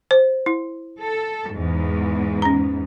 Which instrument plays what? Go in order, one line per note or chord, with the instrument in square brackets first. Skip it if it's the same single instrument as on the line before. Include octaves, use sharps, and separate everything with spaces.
[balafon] C5
E4
[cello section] A4
E2 G#2
[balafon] C#4 A#5